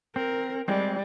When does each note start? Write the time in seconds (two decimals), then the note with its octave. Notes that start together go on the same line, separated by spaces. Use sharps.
0.16 C4 A#4
0.68 G3 G#3 C4